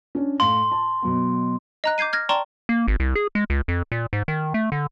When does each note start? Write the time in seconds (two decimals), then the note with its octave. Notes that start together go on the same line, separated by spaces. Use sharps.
0.15 C#4 D4
0.40 A2 F5 C6
0.72 A5
1.02 B2 F#3 B3
1.84 D#5 A#5 F#6
1.98 D6 G6 G#6 C7 D#7
2.13 F6 G#6 A#6
2.29 D5 G5 A5 A#5 C6 C#6
2.69 A#3
2.88 G#1
3.00 C2
3.15 G#4
3.35 G#3
3.50 C#2
3.68 F2
3.92 A#2
4.13 G#2
4.28 D#3
4.54 A3
4.72 D3